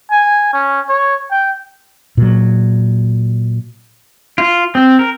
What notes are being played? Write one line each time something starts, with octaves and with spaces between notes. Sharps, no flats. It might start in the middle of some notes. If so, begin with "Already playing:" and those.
G#5
C#4
C#5
G5
A#2 F#3
F4
C4
A#4